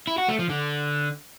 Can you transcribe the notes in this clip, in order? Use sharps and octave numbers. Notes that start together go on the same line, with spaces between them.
E4
F#4
A3
F3
D3